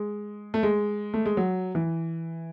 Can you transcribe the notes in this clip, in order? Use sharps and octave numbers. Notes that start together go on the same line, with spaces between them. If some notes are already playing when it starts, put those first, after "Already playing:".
Already playing: G#3
A3
G#3
A3
G#3
F#3
E3